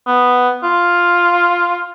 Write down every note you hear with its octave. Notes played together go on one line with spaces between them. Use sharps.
B3
F4